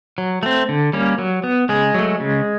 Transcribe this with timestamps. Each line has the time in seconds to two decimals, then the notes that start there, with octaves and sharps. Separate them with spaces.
0.18 F#3
0.43 A3 C4
0.69 D3
0.93 G3 A#3 C#4
1.19 F#3
1.44 B3
1.69 C#3 G#3 G#4
1.94 F#3 A3
2.20 C#3